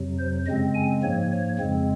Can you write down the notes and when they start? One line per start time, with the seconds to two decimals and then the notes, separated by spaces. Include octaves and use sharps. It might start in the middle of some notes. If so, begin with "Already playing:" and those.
Already playing: F2 C3 F#3
0.19 C5
0.46 F#2 C#3 G#3 C4 D#5
0.75 G#5
1.03 G#2 F3 A#3 C#5
1.31 C#5
1.59 F2 C#3 G#3 C4